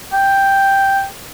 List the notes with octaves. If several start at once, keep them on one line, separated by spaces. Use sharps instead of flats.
G5